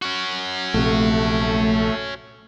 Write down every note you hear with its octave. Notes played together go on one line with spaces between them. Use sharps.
C#4 F#4
A#1 C3 A3